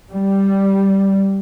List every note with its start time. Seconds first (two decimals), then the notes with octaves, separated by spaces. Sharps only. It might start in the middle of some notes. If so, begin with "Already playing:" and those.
0.12 G3